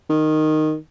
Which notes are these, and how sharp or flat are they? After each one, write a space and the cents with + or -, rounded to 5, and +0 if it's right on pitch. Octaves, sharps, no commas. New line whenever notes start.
D#3 -10